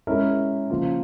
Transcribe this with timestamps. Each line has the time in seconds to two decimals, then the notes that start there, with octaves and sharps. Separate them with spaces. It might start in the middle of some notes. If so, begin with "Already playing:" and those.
0.07 G#3 C#4 E4 A#4
0.70 C#3 F3 A#3 F4